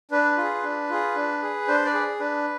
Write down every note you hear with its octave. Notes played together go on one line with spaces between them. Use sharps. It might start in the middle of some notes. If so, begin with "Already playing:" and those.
D4 B4
F4
G#4
D4
F4 G#4
D4
G#4
D4 C5
B4 D5
G#4
D4 B4